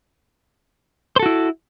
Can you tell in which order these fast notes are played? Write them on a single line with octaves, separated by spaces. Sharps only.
C5 A4 F#4 E4